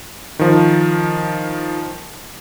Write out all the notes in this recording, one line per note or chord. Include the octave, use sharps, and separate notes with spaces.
D#3 F3